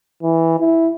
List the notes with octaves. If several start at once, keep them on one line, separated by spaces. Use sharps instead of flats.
E3
E4